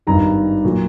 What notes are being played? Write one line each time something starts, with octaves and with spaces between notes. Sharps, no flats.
G#1 G2 D#3 A#5
A#2 F#3